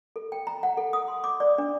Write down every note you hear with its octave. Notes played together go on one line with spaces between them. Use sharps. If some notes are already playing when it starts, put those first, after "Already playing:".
A4
G5
A#5
F#5
A4
D#6
C6
D6
D5
D4